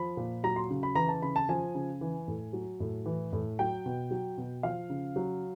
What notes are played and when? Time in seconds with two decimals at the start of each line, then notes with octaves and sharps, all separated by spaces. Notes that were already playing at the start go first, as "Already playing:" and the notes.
Already playing: F3 B5
0.17 A#2
0.44 F#3 A#5
0.56 C6
0.70 C#3
0.83 B5
0.95 E3 A#5
1.08 A5
1.22 C#3 B5
1.36 A5
1.49 F3 G#5
1.75 C#3
2.01 E3
2.28 A2
2.53 F#3
2.80 A2
3.06 E3
3.33 A2
3.59 F#3 G5
3.86 B2
4.11 F#3
4.38 B2
4.63 F3 F5
4.90 C#3
5.16 F#3